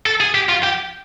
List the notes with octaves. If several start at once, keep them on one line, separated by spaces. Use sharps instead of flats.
A4
G#4
G4
F4
G4